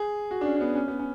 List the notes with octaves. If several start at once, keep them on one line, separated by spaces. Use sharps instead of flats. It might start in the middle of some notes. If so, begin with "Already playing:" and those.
Already playing: G#4
F#4
D4
C#4
C#4
B3
C#4
B3
C#4